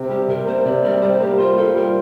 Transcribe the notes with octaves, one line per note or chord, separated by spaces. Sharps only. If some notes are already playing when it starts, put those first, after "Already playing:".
Already playing: C3 C4
G3 G4
C3 A#4
A#3 C5
C3 D5
G3 D5
G3 C5
A#3 G4
F4 C5
F4 A4
G3 A#4